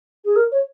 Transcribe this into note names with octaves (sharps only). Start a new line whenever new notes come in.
G#4
A#4
C#5